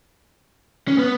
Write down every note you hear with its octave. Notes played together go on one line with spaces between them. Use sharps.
C#4
B3